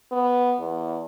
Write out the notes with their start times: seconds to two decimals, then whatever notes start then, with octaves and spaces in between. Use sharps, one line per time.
0.12 B3
0.59 E2